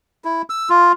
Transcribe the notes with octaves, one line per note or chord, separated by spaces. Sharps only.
E4
E6
F4